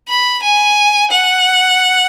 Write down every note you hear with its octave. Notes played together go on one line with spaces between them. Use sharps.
B5
G#5
F#5